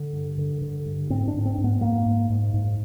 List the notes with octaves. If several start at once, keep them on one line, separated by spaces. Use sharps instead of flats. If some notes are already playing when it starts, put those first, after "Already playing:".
Already playing: D3
G2
D3
D3
G2
G#2 C4
D4
G#2
C4
G#2
B3
G#2 A#3
G#2
G#2
G#2